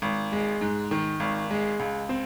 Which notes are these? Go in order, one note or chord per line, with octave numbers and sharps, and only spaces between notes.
G#1
G#3
G#2
D#3
G#1
G#3
C#2
C4